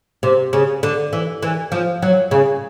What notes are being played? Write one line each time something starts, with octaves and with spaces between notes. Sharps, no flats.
C3
C#3
D3
E3
E3
F3
F#3
C#3